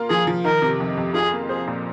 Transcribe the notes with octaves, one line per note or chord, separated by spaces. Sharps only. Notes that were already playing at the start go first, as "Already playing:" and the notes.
Already playing: A#3 F4
F3 G#4
F3
D#3 A#4
C3
F2
F2
F4 G#4
A#3
G#4 C5
A#2